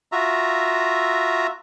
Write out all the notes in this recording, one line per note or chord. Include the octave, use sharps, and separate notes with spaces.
F4 F#4 E5 A#5